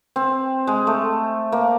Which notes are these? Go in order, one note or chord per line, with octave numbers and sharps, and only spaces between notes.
C4
G#3
A3
A#3